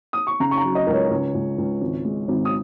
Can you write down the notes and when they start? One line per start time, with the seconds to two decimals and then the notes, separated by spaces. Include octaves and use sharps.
0.13 D#6
0.27 C#6
0.40 C#3 A#5
0.51 C#6
0.58 A#5
0.64 F#3
0.75 D#5
0.87 C#2 A#4
0.93 C#5
1.11 C#2
1.34 C#2
1.58 C#2
1.81 G#1
2.05 G#3
2.28 G#1
2.45 D#6